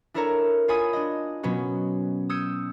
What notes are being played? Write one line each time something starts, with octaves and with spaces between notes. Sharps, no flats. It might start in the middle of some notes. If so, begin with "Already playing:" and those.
D4 E4 A4 A#4 C#5 A#5
F4 C#5 G#5 B5 D#6
D4 D#5
B2 F#3 B3 C#4 F#4
D#6 E6 G6 G#6 C#7